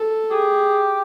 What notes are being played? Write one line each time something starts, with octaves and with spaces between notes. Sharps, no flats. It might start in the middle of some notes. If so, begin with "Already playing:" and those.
Already playing: A4
G4 G#4